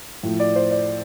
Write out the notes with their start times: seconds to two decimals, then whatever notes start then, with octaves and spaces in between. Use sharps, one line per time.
0.23 A2 F3
0.40 D5
0.56 C5
0.71 D5